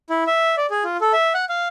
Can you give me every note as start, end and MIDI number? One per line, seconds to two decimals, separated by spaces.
0.10 0.24 64
0.27 0.55 76
0.57 0.66 74
0.70 0.84 68
0.84 0.97 65
1.01 1.13 69
1.13 1.33 76
1.34 1.45 78
1.49 1.68 77